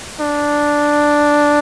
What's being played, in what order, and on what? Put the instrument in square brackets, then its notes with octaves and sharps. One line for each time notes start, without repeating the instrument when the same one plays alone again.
[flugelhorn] D4